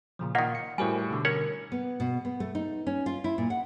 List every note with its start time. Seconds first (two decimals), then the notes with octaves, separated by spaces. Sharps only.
0.19 A#2 C#3 F3
0.35 A#2 D#3 A#3 D#5 F5 F#5
0.55 C#7
0.78 A2 G3 F#4 A#4 C5 G#5
1.10 B2 D3
1.25 C#4 A#4 C#5 F#5
1.72 B3
2.00 B2
2.25 B3
2.40 A3
2.55 D#4
2.87 C#4
3.06 F4
3.24 E4
3.38 A#2
3.50 F#5